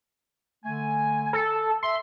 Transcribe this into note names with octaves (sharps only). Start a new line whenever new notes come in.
D3 A3 G#5
A4
E5 C6